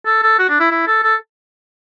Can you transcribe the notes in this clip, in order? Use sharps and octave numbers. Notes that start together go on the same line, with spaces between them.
A4
A4
F#4
D4
E4
E4
A4
A4